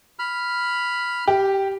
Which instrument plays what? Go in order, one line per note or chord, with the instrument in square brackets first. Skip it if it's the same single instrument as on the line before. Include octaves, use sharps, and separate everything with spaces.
[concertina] B5 F6
[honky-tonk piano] G4